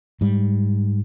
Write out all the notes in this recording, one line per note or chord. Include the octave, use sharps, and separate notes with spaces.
G#2 G3